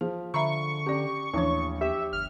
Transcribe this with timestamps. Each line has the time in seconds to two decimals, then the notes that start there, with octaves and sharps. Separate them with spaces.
0.01 F3 G#4
0.34 D3 E5 A#5 B5 C#6
0.86 C#4 G4 D5
1.34 A1 D#2 F3 D4 C#5
1.81 G4 E5
2.13 G1 F6